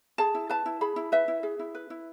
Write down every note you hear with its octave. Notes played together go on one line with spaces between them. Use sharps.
G#4 A5
E4
B4 A5
E4
G#4 B5
E4
B4 E5
E4
G#4
E4
B4
E4